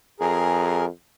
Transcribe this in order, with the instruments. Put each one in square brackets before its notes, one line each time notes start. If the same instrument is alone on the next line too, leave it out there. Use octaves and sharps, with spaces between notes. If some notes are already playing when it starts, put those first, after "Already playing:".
[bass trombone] F2 [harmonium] G#4 A#4